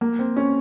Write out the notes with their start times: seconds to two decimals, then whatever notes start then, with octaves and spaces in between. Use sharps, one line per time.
0.01 A#3
0.19 C4
0.37 C#4